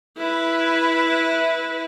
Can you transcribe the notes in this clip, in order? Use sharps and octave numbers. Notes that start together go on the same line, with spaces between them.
E4 B4